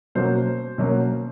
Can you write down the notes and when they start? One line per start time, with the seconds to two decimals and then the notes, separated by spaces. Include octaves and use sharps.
0.15 B2 F#3 A#3 C#4 C5
0.78 B2 F#3 A#3 C#4